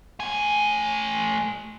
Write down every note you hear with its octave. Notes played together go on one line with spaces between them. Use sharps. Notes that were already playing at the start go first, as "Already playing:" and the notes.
A3 G#5